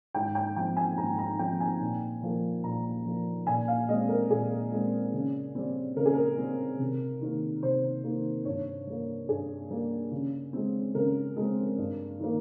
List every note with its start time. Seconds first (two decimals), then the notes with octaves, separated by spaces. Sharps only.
0.14 G#2 G5
0.35 G5
0.56 F3 C4 G5
0.76 G#5
0.97 G#2 A#5
1.18 A#5
1.39 F3 C4 G5
1.60 G#5
1.80 A#2
2.22 F3 A#3
2.64 A#2 A#5
3.05 F3 A#3
3.47 A#2 G#5
3.68 F5
3.89 G#3 C4 D#5
4.09 A#4
4.30 A#2 G#4
4.72 G#3 C4
5.13 C#3
5.55 G3 C4
5.96 C#3 A#4
6.05 G#4
6.14 A#4
6.37 G3 C4
6.79 C3
7.21 D#3 A#3
7.63 C3 C5
8.04 D#3 A#3
8.45 G2 C#5
8.87 G3 A#3
9.28 G2 G#4
9.70 G3 A#3
10.11 C#3
10.53 G#3 C4
10.95 C#3 A#4
11.36 G#3 C4
11.78 G2
12.19 D#3 A#3